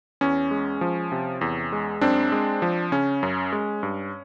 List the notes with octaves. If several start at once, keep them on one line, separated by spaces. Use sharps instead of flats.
E2 C#4
G#3
F3
C3
E2
G#3
F#2 C4 D4
G#3
F3
C#3 C#4
F#2
G#3
G2